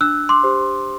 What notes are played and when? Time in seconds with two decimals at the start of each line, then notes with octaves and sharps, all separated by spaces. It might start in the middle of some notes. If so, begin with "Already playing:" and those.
0.01 D4 E6 F#6
0.29 C6 D6
0.43 G4 C5